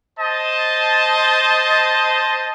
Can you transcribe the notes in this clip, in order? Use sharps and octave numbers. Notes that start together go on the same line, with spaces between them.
C5 D#5 A5